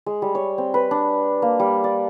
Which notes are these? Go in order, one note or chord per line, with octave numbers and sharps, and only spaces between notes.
G#3
G3
C#5
C4
B4
D4
A#3
G3
D5